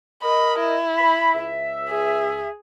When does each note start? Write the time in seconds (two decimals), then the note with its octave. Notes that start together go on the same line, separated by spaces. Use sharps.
0.23 A#4 D#5 B5
0.60 E4
0.97 B5
1.33 C#2 E5
1.90 G#4